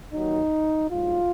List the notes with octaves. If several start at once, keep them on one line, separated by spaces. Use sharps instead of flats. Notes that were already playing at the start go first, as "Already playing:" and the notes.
D#2 D#3 F#3 D#4
A#1 G#2 F#3 F4